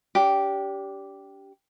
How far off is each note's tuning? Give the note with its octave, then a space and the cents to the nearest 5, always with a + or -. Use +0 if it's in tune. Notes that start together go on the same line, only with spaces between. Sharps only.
D4 -35 G4 -5